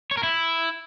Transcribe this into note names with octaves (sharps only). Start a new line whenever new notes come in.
C#5
A#4
E4